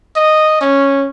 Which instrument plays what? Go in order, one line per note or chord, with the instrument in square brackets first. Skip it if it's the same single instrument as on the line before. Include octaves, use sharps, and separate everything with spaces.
[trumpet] D#5
C#4